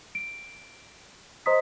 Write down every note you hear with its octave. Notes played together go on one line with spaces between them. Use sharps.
D7
C5 D#5 A#5 C6 D#6 B6